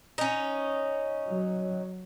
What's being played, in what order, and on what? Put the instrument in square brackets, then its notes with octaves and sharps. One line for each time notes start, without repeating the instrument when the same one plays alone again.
[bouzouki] C#4 D#4
[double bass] F#3